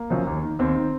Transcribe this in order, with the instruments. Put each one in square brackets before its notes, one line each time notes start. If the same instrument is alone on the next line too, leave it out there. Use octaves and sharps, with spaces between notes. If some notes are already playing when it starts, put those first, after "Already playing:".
Already playing: [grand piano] A#3
F#2 C#3 F3
D#2
D#3
D#2 C4
D#3